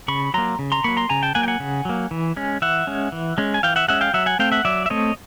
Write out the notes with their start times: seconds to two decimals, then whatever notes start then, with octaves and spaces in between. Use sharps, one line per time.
0.08 C#3 B5 C#6
0.34 F#3 A#3 A#5 C6
0.59 C#3
0.72 A#5 C6
0.84 F#3 A#3 B5 C#6
0.97 A#5 C6
1.09 C#3 G#5 A#5
1.23 G5 A5
1.35 F#3 A#3 F#5 G#5
1.43 G5
1.48 F#5 G#5
1.60 C#3
1.85 F#3 A#3
2.11 E3
2.37 G#3 C#4
2.62 E3 E5 F#5
2.87 G#3 C#4
3.12 E3
3.38 G#3 C#4
3.54 G#5
3.63 E3 F5 G5
3.76 E5 F#5
3.88 G#3 C#4 E5 F#5
4.01 F5 G5
4.14 F#3 E5 F#5
4.26 F#5 G#5
4.39 A3 C4 F5 G5
4.52 E5 F#5
4.65 F#3 D5 E5
4.86 E5
4.90 A3 C4 C#5 D#5